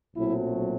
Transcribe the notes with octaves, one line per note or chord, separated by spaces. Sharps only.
B1 A#2 F#3 A3 C4 E4